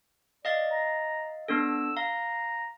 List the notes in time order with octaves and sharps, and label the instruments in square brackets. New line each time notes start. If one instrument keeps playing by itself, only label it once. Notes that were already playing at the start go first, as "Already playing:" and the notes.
[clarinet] D5 [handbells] D#5 F5 A6
[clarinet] A#5
[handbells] B3 D4 A4 [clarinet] E6
[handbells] F5 [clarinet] A#5